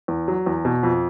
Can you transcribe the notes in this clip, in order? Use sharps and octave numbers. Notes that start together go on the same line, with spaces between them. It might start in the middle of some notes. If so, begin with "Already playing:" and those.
E2
F#3
E2
B2
F2